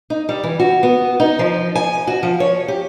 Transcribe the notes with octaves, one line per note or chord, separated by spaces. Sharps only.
D#4
G3
E3
F#4
B3
D#4
F3
G#5
F#4
F3
C#5
G4